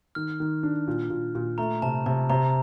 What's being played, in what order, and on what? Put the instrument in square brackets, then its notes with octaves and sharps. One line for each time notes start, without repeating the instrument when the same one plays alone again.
[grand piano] D#3 [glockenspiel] F6
[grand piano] D#3
D4
A#2
A#2
A#2
[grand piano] A3 [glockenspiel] A#5
[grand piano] C3 [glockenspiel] A5
[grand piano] C3 [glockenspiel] A5
[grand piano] C3 [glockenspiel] A#5